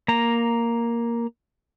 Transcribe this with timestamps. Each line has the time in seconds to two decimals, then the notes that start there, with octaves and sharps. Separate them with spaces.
0.08 A#3 A#5